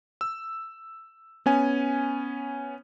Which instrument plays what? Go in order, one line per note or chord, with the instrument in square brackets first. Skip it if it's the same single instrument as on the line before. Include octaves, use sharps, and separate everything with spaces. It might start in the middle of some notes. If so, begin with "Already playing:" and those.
[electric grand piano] E6
B3 C#4 G#5